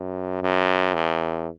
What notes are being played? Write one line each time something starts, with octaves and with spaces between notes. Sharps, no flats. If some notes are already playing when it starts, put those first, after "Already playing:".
Already playing: F#2
F#2
E2